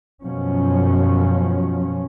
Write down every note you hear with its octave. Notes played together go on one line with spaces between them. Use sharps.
F#2 B2 F3 C#4